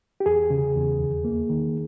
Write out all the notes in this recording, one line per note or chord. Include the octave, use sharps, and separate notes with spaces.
G4
E2 G#4
C#3
E2
D#2
A#3
D#3